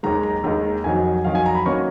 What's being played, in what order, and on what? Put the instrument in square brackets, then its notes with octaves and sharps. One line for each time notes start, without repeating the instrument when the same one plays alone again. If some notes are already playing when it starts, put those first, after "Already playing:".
[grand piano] D#2 D#3 G#3 A#5
A#5
D#2 D#3 G#3 A#5
F2 D#3 F#3 G#5
F2 D#3 F#3 F5
G#5
A#5
B5
D#3 F#3 A#3 C#4 C#6